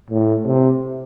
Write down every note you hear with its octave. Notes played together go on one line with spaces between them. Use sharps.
A2
C3